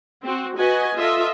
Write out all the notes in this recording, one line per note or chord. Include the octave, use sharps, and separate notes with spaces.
C4 F#4
F#4 B4 D#5 G#5
F4 A4 D#5 E5